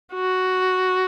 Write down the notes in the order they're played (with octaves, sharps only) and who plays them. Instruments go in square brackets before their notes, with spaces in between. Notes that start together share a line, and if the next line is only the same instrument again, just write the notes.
[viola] F#4